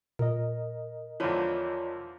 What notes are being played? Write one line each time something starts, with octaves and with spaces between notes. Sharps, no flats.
A#2 A#4 D#5
E2 D3 F3 F4 C#5 D5